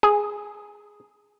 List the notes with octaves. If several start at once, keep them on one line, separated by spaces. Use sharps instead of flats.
G#4